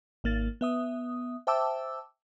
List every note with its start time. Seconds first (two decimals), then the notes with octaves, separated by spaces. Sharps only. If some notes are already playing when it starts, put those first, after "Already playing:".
0.24 G#1 A#3 A6
0.61 B3 E5 D#6
1.47 C5 E5 G5 A5 D6 E6